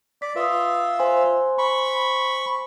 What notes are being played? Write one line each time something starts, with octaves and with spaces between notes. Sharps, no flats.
D5 B6
F4 B4 E5 D#6
C5 G#5 C6
B5 C#6